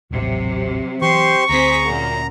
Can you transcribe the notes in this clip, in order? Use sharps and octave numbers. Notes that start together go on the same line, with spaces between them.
D#1 A1 C3 F#3
E3 G4 C5 C6 C#6
D2 C4 G#4 C5 A#5 B6
F#2 A#2